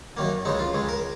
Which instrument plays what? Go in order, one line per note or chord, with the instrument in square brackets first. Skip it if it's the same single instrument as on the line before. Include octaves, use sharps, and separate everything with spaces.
[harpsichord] F#2 D#3 A#3
C#2 C#3 G#3 D#4
F4
C#2 C#3 G#3
A#4